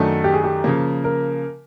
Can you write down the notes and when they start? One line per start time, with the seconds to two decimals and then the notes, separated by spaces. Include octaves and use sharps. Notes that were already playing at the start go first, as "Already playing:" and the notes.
Already playing: F#2 D#3 F#3 A3 D4 A4
0.24 G4
0.34 G#4
0.44 G4
0.64 C#3 F3 A#3
1.04 A#4